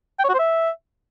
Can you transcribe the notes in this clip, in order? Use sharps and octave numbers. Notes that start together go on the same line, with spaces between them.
G5
C#5
F#4
C5
E5